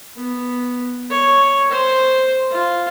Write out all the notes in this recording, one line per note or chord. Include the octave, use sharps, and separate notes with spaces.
B3
C#5
C5
F4